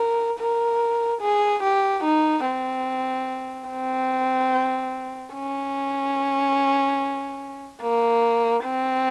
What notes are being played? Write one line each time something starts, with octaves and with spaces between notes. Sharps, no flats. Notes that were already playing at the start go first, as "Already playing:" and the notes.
Already playing: A#4
A#4
G#4
G4
D#4
C4
C4
C#4
A#3
C4